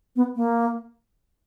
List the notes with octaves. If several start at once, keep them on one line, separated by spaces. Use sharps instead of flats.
B3
A#3